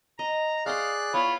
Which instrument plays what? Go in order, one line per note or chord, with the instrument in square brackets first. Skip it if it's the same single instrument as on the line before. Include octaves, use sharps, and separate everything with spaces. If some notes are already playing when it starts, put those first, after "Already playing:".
[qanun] D#5 [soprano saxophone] A#5
[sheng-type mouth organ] G#4 D5 F#6 [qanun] C#5 F#5 C6 [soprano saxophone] F5
[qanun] B3 E4 [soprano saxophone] F4 [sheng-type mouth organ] C#5 [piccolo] B5